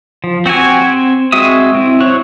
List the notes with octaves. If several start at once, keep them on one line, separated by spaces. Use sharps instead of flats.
F3
C4 F#4 G4 G#5
C4
G#3 C4 F#4 E5 D#6
C4 E4
F#3 C5 C#5 C#6 F#6